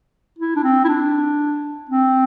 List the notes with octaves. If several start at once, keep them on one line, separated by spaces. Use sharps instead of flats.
E4
D4
C4
E4
D4
C4